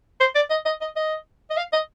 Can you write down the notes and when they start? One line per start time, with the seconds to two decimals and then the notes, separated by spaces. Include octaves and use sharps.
0.20 C5
0.35 D5
0.50 D#5
0.66 D#5
0.81 D#5
0.96 D#5
1.51 D#5
1.57 F5
1.73 D#5